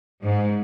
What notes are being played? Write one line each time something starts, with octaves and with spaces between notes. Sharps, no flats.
G#2